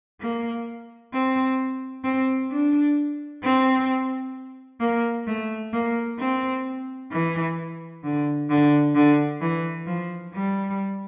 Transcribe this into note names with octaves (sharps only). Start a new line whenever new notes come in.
A#3
C4
C4
D4
C4
A#3
A3
A#3
C4
E3
D3
D3
D3
E3
F3
G3